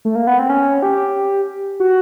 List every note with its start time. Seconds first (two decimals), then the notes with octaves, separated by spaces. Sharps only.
0.05 A3
0.15 A#3
0.27 B3
0.39 C4
0.49 C#4
0.82 G4
1.80 F#4